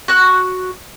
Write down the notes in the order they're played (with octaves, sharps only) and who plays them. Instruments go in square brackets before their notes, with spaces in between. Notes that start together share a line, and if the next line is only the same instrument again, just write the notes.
[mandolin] F#4 F#6